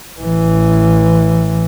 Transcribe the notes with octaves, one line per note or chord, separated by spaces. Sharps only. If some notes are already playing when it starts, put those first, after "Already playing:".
A1 E3